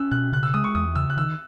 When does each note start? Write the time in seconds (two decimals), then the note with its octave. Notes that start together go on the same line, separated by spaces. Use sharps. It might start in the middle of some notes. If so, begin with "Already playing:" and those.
Already playing: C#4 E6 F#6
0.11 B2 F#6
0.32 C#3 F#6
0.43 E6
0.54 G#3 D#6
0.64 C#6
0.75 E2 D#6
0.95 C#3 E6
1.10 F#6
1.17 D#3 E6